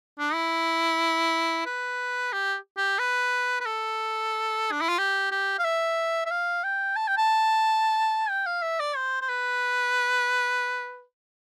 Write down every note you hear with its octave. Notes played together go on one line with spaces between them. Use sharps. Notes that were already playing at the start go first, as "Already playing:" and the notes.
D4
E4
B4
G4
G4
B4
B4
A4
D4
E4
F4
G4
G4
F5
E5
E5
F5
G5
A5
G5
A5
G5
F5
E5
D5
C5
C5
B4